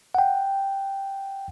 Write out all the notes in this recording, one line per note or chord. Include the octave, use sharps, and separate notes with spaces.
F#5 G5